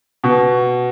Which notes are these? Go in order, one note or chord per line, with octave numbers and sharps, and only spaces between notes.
B2